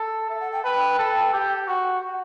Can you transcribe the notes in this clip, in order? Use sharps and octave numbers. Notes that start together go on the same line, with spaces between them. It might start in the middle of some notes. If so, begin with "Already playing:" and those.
Already playing: A4
A4 E5
F#5
G5
B4 G5
A4
G4
F#4 F#5